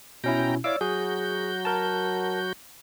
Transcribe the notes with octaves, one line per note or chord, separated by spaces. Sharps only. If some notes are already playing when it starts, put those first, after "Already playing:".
B2 C#4 E4 G5 A#5
E4 C#5 D5 F5 D6 E6
F#3 F#4 G#4 G6
A#4 A5